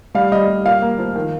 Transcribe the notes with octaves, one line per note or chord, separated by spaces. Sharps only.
G3 F5
G3 D#5
G3
A#2 F5
A#3
F3
D#3